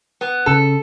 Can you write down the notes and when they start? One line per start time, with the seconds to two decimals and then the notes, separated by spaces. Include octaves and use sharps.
0.21 B3
0.46 C#3 A4